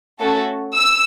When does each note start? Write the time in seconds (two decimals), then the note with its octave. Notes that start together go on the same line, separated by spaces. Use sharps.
0.19 A3 C#4 F#4 A4
0.76 E6